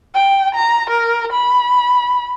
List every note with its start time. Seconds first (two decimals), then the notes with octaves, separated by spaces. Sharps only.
0.14 G5
0.55 A#5
0.90 A#4
1.32 B5